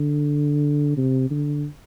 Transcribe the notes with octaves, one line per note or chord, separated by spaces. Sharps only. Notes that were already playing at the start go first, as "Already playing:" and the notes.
Already playing: D3
C3
D3